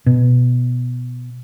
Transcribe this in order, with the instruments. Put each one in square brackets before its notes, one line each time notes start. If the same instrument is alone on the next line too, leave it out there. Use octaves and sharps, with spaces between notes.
[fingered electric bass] B2